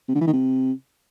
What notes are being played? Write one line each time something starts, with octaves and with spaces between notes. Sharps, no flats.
C3
D3
E3
D#3
C3